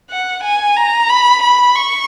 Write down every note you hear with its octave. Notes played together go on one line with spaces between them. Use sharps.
F#5
G#5
A#5
B5
B5
C#6